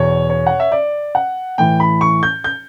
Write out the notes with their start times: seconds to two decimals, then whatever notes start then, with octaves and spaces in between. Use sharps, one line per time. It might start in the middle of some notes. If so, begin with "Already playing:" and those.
Already playing: E2 B2 C#5
0.30 C#5
0.47 F#5
0.60 E5
0.72 D5
1.15 F#5
1.58 A2 E3 G5
1.80 B5
2.01 C#6
2.23 G6
2.44 G6